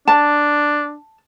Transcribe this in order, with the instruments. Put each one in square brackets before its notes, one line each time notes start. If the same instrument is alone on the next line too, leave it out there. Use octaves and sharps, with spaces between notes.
[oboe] D4 [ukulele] A5